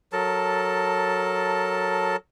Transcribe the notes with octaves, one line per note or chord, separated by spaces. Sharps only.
F#3 A4 A#4 A5